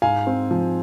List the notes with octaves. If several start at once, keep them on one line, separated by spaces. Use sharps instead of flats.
G#2 F5 G#5
C4
F3